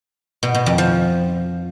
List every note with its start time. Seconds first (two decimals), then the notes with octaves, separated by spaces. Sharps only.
0.43 B2
0.55 B2
0.66 F2
0.78 F3